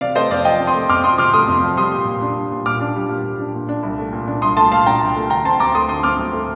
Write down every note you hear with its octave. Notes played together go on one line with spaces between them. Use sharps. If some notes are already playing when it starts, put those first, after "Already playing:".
C3 D5 F5
A3 C5 D#5
F2 D5 F5
F3 D#5 G5
C3
C6 D#6
A3
F2 D6 F6
F3 C6 D#6
C3 D6 F6
A3 C6 D#6
F2
F3
G3 C6 D#6
A#2
A#2
D4
G3
A#2
A#2 D6 F6
D4
G3
A#2
A#2
D4
A#2
D4
C2
A3
A#2
D4
C2 C6 D#6
A3 A5 C6
A#2 F5 A5
D4 G5 A#5
C2
A3
D3 G5 A#5
C4 A5 C6
D2 A#5 D6
A3 C6 D#6
D3 C6 D#6
C4 D6 F6
D2
A3